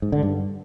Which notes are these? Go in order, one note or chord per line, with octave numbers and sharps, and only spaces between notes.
G#2
D3
G2